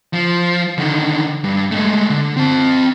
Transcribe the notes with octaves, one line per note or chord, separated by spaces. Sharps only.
F3
D3 D#3
G2
G#3 A3
D3
C4 A5